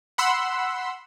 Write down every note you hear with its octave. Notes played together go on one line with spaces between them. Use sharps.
F#5 B5 C6 E6